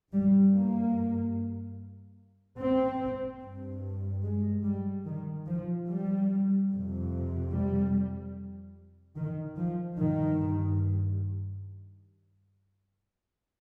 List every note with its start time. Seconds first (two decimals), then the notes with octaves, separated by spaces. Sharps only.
0.12 G2 G3
0.54 A#3
2.59 C4
3.41 G2
4.24 G#3
4.64 G3
5.05 D#3
5.47 F3
5.88 G3
6.70 F2 C3
7.52 G3
9.16 D#3
9.57 F3
9.98 G2 D#3